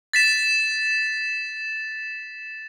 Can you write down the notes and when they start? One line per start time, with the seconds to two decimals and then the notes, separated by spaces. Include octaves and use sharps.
0.13 A6 B6 E7